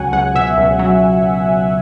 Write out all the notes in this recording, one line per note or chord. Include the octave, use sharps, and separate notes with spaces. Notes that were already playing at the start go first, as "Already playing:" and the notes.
Already playing: C#2 F#3 F#5 G#5
C#2 F#5
B2 E5
C#2
F#3